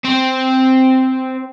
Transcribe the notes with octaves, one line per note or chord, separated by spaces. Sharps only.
C4